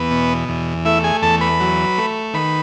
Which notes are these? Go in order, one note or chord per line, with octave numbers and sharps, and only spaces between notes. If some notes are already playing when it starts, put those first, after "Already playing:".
Already playing: E2 B3 B4
B2
E2
A3 E4 E5
G#4 G#5
E2 A4 A5
B4 B5
F#3
A3
D#3 B4 B5